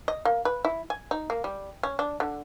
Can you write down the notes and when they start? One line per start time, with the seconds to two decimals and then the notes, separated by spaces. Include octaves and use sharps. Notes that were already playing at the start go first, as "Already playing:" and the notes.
0.08 D#5
0.25 A#3
0.45 B4
0.65 E4
0.90 G#5
1.11 D#4
1.30 A#3
1.44 G3
1.83 C#4
1.99 D4
2.20 D3